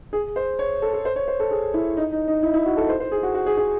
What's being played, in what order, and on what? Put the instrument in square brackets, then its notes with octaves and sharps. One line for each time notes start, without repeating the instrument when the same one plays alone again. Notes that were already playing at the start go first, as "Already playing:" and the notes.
[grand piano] G#4
C5
C#5
A4
A4
C5
C#5
C5
A4
G#4
E4
D#4
D#4
D#4
E4
E4
F#4
A4
C5
C5
G#4
F#4
F#4
G#4
G#4